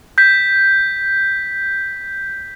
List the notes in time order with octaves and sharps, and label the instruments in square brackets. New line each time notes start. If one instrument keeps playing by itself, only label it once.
[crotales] G6 B6